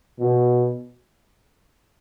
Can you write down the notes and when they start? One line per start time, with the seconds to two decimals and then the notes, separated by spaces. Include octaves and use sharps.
0.19 B2